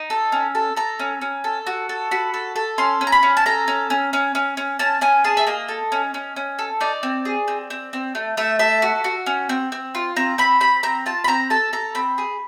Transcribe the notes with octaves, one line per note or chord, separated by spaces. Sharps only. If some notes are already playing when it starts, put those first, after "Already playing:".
Already playing: D#4
A4
C#4
A4
A4 A#5
C#4
C#4
A4
F#4
A4
F#4 B5
A4
A4
C#4 C6
C#4
A#5
B5
C#4
A5
A4 A#5
C#4
C#4
C#4
C#4
C#4
C#4 A5
C#4 G#5
G#4 A5
E5
A#3 D#5
A4
C#4
C#4
C#4
A4
D#4 D5
C4
G#4
C4
C4
C4
A3
A3 E5
A4 E5
F#4
F#4
C#4
C4
C4
F4
C4 A#5
C4 B5
C4 B5
C4 A#5
F4 A5
B5
C4 A#5
A4 A5
A4 A#5
C4 B5
G#4